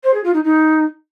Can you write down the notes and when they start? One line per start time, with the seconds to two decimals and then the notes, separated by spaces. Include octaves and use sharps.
0.04 C5
0.14 G#4
0.24 F4
0.34 D#4
0.44 D#4